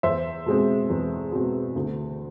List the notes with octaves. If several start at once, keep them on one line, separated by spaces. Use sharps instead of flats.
E2 C5 E5
B2 G#3 C4
E2
B2 G#3 C4
D2